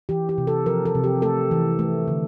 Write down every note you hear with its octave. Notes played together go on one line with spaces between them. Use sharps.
E3 G4
G4
C3
A4
F3 A#4
A4
C3
G4
A3 A4
E3
A3
D3